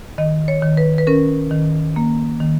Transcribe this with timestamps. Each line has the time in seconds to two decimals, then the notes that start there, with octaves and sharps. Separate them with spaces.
0.18 D#3 D#5
0.48 C#5
0.63 D#3
0.77 B4
0.98 B4
1.07 C#4 A#4
1.51 D#3
1.96 A#3
2.40 D#3